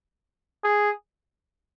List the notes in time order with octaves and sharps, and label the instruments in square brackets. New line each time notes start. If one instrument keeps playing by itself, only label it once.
[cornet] G#4